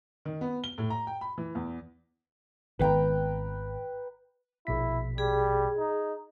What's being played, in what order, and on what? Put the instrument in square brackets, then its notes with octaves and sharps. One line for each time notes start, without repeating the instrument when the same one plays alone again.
[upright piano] D#3
B3
G7
A2
A#5
G5
B5
E3
E2
[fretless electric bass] G#1 D#3 B3 [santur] B4 G5 A#5
[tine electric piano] A#1 B2 B6 [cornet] E4
[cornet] G3 [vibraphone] G#4
[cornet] D#4